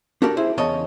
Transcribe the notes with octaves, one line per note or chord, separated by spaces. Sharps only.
D4 F#4 G4 A4 A#4 D5
E4 G#4 C5
E2 C#3 C#5 D#5 A5